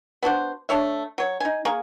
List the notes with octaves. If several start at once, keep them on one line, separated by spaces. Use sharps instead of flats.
B3 D4 F#4 C5
A3 D4 C#5 E5
F#3 C#5
D#4 G#5
A#3 G#4 A#4 C#6